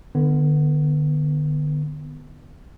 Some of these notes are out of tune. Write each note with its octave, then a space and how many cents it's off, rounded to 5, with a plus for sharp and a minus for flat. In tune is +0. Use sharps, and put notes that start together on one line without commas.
D3 +30 B3 +0